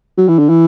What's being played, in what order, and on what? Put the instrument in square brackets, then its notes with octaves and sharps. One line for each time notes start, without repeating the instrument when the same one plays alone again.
[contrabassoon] F#3
E3
D3
E3